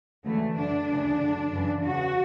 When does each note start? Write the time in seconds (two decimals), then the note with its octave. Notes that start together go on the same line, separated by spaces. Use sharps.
0.24 D2 C#3 E3 A3
0.56 F#2 D3 D4
0.88 D2 C#3 E3
1.20 F#2 D3
1.51 F#2 C#3 E3
1.83 E2 C#3 E3 F#4